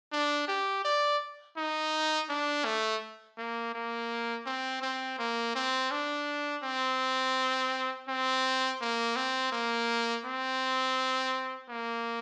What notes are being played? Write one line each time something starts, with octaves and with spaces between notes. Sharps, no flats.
D4
G4
D5
D#4
D4
A3
A#3
A#3
C4
C4
A#3
C4
D4
C4
C4
A#3
C4
A#3
C4
A#3